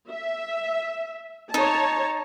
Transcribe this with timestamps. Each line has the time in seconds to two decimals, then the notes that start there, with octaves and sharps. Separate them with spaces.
0.11 E5
1.54 D#4 C#5 A5